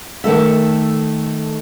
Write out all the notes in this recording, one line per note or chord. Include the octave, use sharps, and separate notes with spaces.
D#3 A3 A4 E5